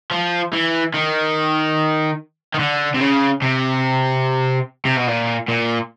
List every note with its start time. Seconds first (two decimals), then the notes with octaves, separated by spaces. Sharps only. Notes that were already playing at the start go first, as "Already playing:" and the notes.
0.11 F3
0.53 E3
0.94 D#3
2.54 D#3
2.59 D3
2.94 C3
3.01 C#3
3.42 C3
4.85 C3
4.97 B2
5.07 A#2
5.48 A#2